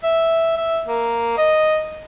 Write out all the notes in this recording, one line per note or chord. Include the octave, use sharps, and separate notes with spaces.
E5
E5
A#3
D#5